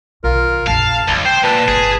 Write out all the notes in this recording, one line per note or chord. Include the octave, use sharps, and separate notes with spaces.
B1 D#3 F4 A#4
A#1 F2 F5 A5
B1 D3 G#3
C5 G5
A#2 B4 A5
D1 G1 G#4